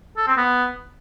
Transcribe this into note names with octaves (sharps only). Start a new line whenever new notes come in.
A4
C4
B3